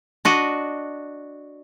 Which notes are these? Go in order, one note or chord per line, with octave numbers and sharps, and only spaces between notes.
D4 F#4 D#5